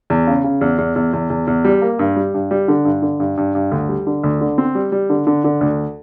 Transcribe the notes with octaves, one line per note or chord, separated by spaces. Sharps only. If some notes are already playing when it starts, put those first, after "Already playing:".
E2
C#3
C#3
E2
E2
E2
E2
E2
E2
G3
A#3
G2
G3
G2
G3
D3
G2
D3
G2
G2
G2
D2
G3
D3
D2
D3
C4
G3
G3
D3
D3
D3
D2